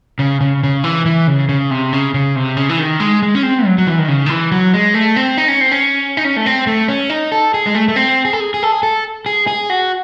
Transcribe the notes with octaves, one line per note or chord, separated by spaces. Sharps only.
C#3
C#3
C#3
E3
E3
C#3
C#3
C3
C#3
C#3
C3
C#3
E3
D#3
G#3
G#3
C#4
C4
F#3
F#3
E3
D#3
C#3
D#3
E3
F#3
G#3
A3
C4
D#4
C#4
C4
C#4
D#4
C#4
A3
C4
A3
C#4
D#4
A4
G#4
G#3
A3
A3
C4
G#4
A4
G#4
G#4
A4
G#4
A4
G#4
G#4
F#4